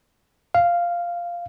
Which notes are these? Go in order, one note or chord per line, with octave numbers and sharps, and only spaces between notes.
F5